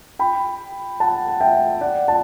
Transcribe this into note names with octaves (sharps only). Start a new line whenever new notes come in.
G5 B5
F#5 A5
F#5
E5 G5
D5 F#5
F#5 A5